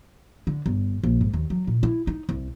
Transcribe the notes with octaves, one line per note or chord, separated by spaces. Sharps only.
D3
G1
A#1
G#2
D#2
F#3
A#2
E4
D#4
C2